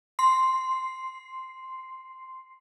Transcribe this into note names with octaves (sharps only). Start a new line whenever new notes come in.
C6 C7